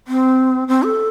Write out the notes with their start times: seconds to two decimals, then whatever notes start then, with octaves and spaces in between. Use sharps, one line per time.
0.08 C4
0.68 C4
0.83 A4